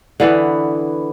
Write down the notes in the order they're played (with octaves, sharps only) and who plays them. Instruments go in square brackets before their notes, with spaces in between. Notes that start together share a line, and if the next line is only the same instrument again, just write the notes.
[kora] D3 E3 B3